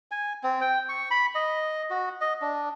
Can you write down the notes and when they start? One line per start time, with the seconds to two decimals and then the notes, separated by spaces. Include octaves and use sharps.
0.11 G#5
0.43 C4
0.61 G5
0.89 C#6
1.11 B5
1.35 D#5
1.90 F#4
2.21 D#5
2.41 D4